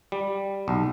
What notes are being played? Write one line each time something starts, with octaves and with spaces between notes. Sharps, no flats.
G3
B1